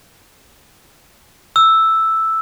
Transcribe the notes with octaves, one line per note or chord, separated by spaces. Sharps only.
E6